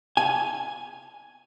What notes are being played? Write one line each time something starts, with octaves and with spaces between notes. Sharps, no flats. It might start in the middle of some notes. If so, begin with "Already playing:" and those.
G#5